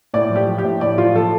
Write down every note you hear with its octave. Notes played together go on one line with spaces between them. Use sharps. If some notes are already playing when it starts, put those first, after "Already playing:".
A2 D5
F3
G4
F3
G4
A2
A2 D5
F3 F4
F3 A4